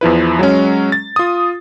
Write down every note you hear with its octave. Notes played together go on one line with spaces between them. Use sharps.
E2 F3 E4 B4
F#3 G#3 C#4
A6
F4 D#6